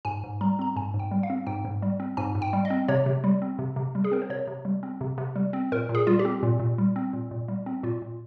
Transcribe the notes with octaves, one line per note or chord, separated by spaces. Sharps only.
G#2 G#5
G#2
G3 A#5
C4 A#5
G#2 G#5
G#2
G5
G3
F5
C4
G#2 G5
G#2
G3
C4
G#2 G#5
G#2
G5
G3
D#5
C4
C3 C#5
C3
G3
C4
C3
C3
G3
G#4
C4 A#4
C5
C3 C#5
C3
G3
C4
C3
C3
G3
C4
A#2 A#4
A#2
G#4
G3 F4
G4
C4
A#2
A#2
G3
C4
A#2
A#2
G3
C4
A#2 F4
A#2